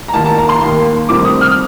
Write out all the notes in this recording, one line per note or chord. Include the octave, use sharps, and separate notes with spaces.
A#5
D#2 D#3 A#3 A5
A5
A#5
C6
D#2 D#3 A#3
D2 C3 D#3 G3 C4 D6
D#6
F6